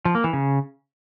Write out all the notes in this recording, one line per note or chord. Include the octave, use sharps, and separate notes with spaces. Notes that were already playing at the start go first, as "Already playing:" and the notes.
F3
A#3
E3
C#3